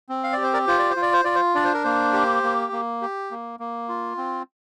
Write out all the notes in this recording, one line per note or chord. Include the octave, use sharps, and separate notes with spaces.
C4
F5
G4 D5
C5
A#4 D5
F4 C5
D5
C5
F4
D5
C5
F4 D5
C5
D4 D5
C5
A#4
A#3 C5
G4
A#3
A#3
G4
A#3
A#3
F4
C4